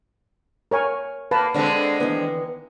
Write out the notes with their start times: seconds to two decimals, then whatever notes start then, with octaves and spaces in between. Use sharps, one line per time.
0.71 A#4 C#5 G#5
1.31 A#3 B4 A5
1.54 D3 G#3 C4 D4 A4
2.00 D#3 E3 B3